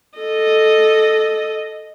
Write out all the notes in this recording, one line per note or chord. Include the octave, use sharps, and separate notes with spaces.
A4 D#5